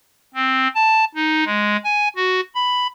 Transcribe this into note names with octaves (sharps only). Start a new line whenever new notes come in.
C4
A5
D#4
G#3
G#5
F#4
B5